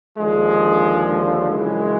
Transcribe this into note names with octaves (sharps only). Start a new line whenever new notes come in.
D#2 D3 F3 G#3
F#2 C#3 E3 G#3